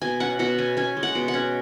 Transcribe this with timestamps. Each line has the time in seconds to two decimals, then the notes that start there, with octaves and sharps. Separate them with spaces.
0.02 B2 G#5
0.20 C#4 F#5
0.39 B2 F#5
0.58 C#4 G#5
0.77 C#4 G#5
0.97 G#3
1.03 F#5
1.15 B2
1.28 F#5
1.34 C#4